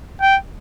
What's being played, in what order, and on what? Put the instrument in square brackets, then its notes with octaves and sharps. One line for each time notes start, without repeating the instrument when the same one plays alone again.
[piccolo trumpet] G5